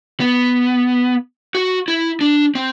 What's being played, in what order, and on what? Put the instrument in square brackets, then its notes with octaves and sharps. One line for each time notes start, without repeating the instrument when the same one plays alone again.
[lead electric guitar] B3
F#4
E4
D4
C4